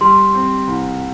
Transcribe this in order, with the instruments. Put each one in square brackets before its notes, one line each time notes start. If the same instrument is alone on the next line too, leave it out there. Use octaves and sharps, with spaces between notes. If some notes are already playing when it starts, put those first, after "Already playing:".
[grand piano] G3 [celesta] C6
[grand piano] C4
C2